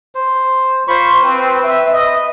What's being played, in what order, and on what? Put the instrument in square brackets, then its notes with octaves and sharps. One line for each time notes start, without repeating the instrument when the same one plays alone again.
[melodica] C5
[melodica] F4 B5 C#6 [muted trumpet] C5
[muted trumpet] C4 [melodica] B4
[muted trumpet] E5
D#5